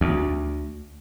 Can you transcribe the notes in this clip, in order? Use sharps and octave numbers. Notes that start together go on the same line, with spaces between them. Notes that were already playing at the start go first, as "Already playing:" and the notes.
D2